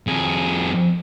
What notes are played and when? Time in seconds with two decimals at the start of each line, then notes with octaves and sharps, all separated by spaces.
0.07 F2 G#4